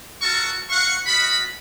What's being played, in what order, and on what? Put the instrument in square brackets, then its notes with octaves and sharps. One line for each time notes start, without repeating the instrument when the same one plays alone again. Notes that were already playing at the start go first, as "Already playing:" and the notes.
[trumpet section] F4 F#4 A4 A#4 A5 C#6
F#4 F5 F#5 C#6
F4 F#4 D#5 F#5 B5